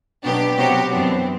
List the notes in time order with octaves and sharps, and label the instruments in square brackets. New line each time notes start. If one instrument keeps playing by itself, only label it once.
[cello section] B2 F#3 B3 D4 [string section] G4
[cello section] C3 F#3 B3 F#4 C5 [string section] G4
[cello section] F#2 E3 B3 D4 [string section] C4